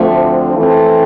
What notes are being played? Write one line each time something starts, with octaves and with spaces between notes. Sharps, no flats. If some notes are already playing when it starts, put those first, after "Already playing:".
Already playing: D2 D3 F3 A3 C4
E3 A3 C4